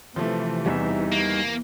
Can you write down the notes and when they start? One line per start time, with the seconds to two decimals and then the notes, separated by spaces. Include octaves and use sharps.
0.16 C3 E3 F3 A3
0.66 E2 G3 D#4 E5
1.13 A#3